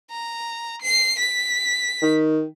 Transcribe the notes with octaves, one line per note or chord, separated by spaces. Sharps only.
A#5
C7
B6
D#3